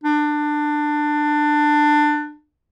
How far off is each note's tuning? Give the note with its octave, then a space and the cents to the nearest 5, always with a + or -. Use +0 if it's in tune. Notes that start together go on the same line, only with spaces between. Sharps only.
D4 +20